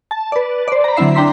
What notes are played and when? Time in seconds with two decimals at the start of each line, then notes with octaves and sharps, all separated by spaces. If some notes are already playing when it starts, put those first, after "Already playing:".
0.11 A5
0.32 B4 D5
0.68 C5 D5
0.84 A#5 B5
0.96 D3 F#3 C4 E4 E5 C7
1.15 D4 G5 A#5 C6 B6